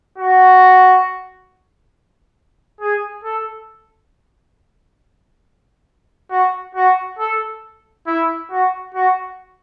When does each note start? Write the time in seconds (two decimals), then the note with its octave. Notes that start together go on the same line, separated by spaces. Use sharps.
0.18 F#4
2.81 G#4
3.24 A4
6.31 F#4
6.75 F#4
7.19 A4
8.07 E4
8.51 F#4
8.94 F#4